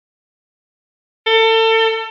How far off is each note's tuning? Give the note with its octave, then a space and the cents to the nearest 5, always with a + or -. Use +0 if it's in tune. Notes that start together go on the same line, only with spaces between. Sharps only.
A4 +30